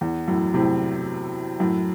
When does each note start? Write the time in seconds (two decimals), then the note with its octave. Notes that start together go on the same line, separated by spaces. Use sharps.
0.01 E2
0.28 F#2 A2
0.54 A2 C3
1.60 F#2 A2